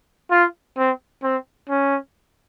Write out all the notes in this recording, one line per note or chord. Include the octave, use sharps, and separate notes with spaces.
F4
C4
C4
C#4